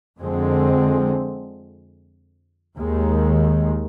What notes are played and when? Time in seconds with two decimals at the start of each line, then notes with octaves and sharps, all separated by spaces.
0.17 F2 D3 G#3 C4
2.78 D#2 D#3 G#3